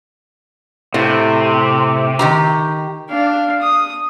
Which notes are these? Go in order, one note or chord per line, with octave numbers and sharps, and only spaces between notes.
A2 C3
D#3 G4 A#5
D4 F5
D#6